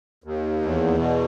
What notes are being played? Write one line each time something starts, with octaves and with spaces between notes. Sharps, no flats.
D#2
E2
B2